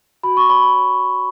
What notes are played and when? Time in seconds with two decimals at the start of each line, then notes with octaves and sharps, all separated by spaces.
0.23 F#4 B5
0.37 C#6
0.49 C#5 B5